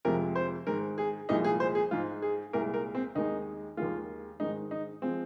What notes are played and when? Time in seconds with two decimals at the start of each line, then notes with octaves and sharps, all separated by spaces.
0.05 F2 C3 F3 G#3 A#4
0.36 C5
0.67 G#2 D#3 G#3 A#4
0.98 G#4
1.29 C2 A#2 F3 G#3 D#4
1.45 G#4
1.60 C5
1.75 G#4
1.91 G#2 G#3 F4
2.22 G#4
2.53 C2 A#2 G#3 A#4
2.74 A#4
2.95 C4
3.15 D#2 D#3 G#3 D#4
3.77 D#2 D#3 G#3 F4
4.40 G#2 D#3 G#3 D#4
4.71 D#4
5.02 F3 G#3 C4